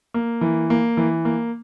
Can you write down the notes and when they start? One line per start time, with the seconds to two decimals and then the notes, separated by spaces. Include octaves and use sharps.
0.14 A#3
0.41 E3
0.70 A#3
0.97 E3
1.25 A#3